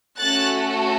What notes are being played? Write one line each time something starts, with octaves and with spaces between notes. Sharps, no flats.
A3 C#4 F#4 A4 F#6 A6